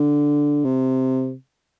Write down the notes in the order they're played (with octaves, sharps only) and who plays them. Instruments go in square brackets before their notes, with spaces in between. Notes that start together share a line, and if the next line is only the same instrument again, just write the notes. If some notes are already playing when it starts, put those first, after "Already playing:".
Already playing: [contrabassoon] D3
C3